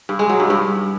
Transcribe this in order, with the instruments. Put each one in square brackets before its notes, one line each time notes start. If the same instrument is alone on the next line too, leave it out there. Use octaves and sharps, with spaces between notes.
[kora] G2
G#3
F#3
G2
G2